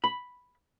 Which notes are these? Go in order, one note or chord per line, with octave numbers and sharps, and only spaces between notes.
B5